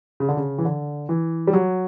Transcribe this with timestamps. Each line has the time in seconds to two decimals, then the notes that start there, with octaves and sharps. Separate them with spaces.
0.20 C#3
0.29 D3
0.37 C#3
0.58 E3
0.65 D3
1.09 E3
1.47 G3
1.53 F#3